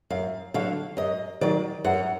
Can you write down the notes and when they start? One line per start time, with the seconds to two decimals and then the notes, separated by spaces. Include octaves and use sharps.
0.10 F#2 F5
0.54 D3 F#3 F5
0.97 F#2 D#5
1.41 D#3 F#3 D5
1.84 F#2 F#5